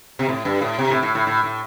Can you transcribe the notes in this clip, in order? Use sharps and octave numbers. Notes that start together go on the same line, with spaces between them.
C3
A2
G2
A2
C3
A2
A2
A2
A2
A2